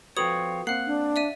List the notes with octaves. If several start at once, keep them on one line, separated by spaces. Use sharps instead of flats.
F3 C4 F#4 A4 B4 C#5 D#6 F#7
A#3 C4 F5 F#5 C7
D4
D5 E5 D#7